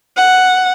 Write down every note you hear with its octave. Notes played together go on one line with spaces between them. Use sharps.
F#5